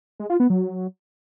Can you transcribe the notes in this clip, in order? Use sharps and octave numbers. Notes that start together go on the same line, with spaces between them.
G#3
F4
B3
F#3